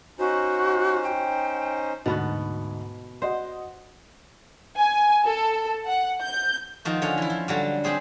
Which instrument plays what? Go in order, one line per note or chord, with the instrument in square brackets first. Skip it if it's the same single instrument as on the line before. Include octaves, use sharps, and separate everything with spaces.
[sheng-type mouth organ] C#4 D#4 C5 [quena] F#4
[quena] G5
[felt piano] D2 G#2 [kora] B2 B3 F#4
[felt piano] F#4 D#5 F#5 [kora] C5
[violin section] G#5
A4
F#5
G6
[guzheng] D#3 F3 F#4
D3 C#4 C#5
E3 E4
F3
D3 F#3 G3
C4 G4 G#4 C5